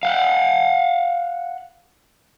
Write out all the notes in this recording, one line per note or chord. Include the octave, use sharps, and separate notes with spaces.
F5 F#5